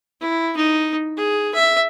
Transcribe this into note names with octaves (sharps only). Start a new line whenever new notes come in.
E4
D#4
G#4
E5